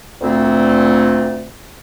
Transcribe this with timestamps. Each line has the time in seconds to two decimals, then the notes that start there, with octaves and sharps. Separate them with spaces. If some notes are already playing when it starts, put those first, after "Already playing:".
0.22 D2 A#2 A3 C4